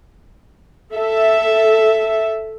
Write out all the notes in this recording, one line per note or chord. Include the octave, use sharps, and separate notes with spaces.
A4 E5